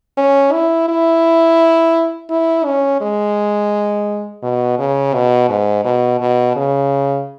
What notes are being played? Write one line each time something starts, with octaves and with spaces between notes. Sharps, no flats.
C#4
E4
E4
E4
C#4
G#3
B2
C#3
B2
G#2
B2
B2
C#3